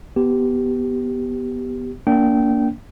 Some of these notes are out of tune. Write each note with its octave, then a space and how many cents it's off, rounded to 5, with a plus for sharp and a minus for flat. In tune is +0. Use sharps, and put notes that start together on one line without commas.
B3 +0 G4 -10
A#3 +0 D4 -30 G5 -20